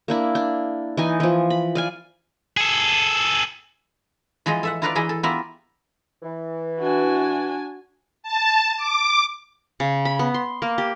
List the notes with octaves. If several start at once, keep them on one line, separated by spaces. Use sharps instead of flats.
A#3 D4 E4
D4
E3 D#4 G#5
E3 F3
B5
D5 F5 G#5
G#4 A4
E3 F3 G#3 G#4 D#5
A4 E5 F#5
E4 F4 A#4 B4 D5 F5
E3 E4 G#4 D#5
A4
B3 E4 F4 G4 A#4 E5
E3
D4 F#4 G#5
A5
D6
C#3
B5
B3
C6
A#3
G4